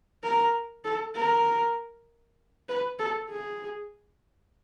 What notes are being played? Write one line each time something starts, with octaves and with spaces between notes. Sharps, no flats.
A#4
A4
A#4
B4
A4
G#4